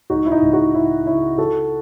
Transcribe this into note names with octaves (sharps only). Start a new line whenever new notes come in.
C#2 D#4 F#4
E4
D#4
C#2
D#4 F#4
C#3 E4
C#3 E4
E3 F#4 A4